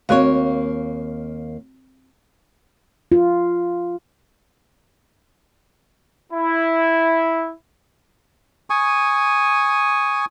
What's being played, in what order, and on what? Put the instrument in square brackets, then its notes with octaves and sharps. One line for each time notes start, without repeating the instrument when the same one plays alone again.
[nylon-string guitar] D#2 A#3 C#5 [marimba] C4 F#4 F5
[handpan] F4
[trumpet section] E4
[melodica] G#5 C#6 D#6